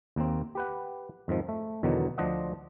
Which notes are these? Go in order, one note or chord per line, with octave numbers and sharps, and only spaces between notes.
D#2 A#3 C4
G4 B4 F#5
F2 G#2 D#3 F3
A3
E2 B2 D3 D#3 F#3
D2 F3 D4 C5 D#5 F#5